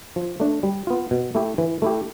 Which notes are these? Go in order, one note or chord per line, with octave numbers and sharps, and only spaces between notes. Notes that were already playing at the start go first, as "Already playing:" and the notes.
F3
A3 D4
G3
B3 F4
B2
A3 E4 G4
E3
A3 E4 G4